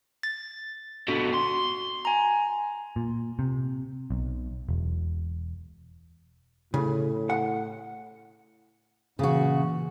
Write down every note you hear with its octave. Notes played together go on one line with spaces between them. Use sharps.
A6
B2 D3 F#4
C6
G#5 A#5
A#2
C3
B1
E1
A2 C#3
F#5
A#2 C#3 E3 F#4